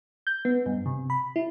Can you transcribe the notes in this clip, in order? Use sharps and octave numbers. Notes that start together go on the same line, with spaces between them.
G6
B3
G2
C3
B5
E4